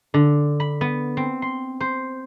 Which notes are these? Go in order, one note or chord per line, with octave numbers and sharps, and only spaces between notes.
D3
B5
B3
C4
C6
C5